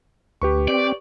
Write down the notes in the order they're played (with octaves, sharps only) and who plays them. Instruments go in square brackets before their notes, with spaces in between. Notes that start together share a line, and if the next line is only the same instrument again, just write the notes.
[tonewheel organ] D2 [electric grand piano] G4 B4 C#6
[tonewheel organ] C4 [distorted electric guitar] D5